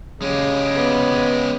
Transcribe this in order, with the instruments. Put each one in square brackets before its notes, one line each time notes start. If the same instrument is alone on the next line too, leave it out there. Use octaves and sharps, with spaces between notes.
[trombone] C#3 [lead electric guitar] G#3 G4
[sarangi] B3